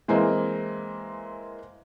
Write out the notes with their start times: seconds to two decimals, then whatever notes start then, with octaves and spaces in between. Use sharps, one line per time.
0.08 E3 G#3 A#3 C4